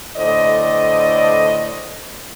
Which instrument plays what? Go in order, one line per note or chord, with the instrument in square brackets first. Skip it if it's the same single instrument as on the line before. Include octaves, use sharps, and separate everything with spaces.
[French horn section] A2 D3 C5 D5 D#5